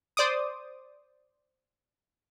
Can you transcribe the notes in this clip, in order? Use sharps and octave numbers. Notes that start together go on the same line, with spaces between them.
C5 D5 D6 D#6